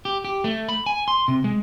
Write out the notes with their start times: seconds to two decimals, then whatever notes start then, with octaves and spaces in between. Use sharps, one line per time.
0.05 G4
0.25 G4
0.44 A3
0.69 B5
0.86 G#5
1.08 C6
1.28 C3
1.44 G#3